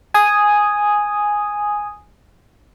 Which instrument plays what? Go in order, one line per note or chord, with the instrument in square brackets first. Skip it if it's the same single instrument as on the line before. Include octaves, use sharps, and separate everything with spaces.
[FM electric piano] G#5 D#6